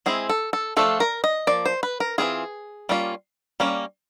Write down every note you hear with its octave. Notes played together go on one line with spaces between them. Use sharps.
G#3 C4 E4 G#4
A4
A4
F3 A3 D4 F4 A4
A#4
D#5
F3 A#3 D5
C5
B4
A#4
E3 G3 C4 F4 G#4
G3 A#3 C#4 F4
G3 A#3 C#4